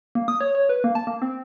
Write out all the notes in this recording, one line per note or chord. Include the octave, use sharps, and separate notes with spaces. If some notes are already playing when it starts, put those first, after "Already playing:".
A#3
D#6
C#5
C#5
B4
A#3
A5
A#3
C4